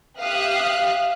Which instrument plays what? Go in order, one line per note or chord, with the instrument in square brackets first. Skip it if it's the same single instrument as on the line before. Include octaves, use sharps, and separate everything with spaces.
[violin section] G4 E5 F5 D#6 F6 F#6